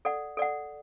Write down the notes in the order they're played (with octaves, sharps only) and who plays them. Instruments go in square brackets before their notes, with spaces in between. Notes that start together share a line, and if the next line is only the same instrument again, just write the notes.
[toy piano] A4 D5 F#5
A4 D5 F#5